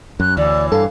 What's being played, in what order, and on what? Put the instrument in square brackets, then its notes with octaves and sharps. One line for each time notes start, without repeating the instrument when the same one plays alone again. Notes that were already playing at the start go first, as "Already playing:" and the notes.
[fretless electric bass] F#2 [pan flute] F#6
[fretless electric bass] D2 [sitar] A2 E3 [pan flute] D5
[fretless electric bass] G2 [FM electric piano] A4 [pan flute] F5